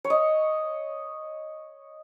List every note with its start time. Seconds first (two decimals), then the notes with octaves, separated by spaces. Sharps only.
0.04 C#5
0.10 D#5